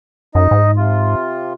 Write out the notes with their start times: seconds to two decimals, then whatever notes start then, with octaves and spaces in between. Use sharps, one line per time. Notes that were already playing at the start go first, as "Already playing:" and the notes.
0.35 F#2 D#4 D#5
0.51 G#2
0.76 C3 F4